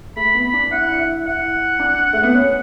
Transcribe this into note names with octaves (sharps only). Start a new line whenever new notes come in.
A3 B5
B3
B5
D4
E4 F#5
D4
E4
E4 F#5
D4
A3
B3
C#4